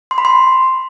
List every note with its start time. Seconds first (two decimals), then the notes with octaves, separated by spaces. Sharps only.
0.11 C6
0.18 B5
0.25 C6